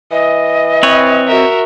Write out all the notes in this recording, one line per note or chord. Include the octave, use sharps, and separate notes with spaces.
E3 D#5
C4 B4 C#5
F#4 A#4 E5